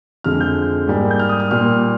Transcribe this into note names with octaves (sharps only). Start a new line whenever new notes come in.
F2 D3 G#3 F6
G6
G#2 G3 A#3
G6
F6
D#6
F6
A#2 G3 A#3 F6